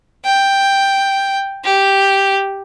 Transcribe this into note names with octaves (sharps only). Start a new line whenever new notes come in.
G5
G4